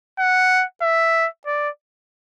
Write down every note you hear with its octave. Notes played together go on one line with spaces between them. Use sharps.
F#5
E5
D5